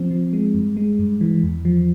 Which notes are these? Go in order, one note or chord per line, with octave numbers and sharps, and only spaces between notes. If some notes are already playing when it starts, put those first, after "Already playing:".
Already playing: F3 C4
F3
G#3
G2
G#3
G2
E3
E2
F3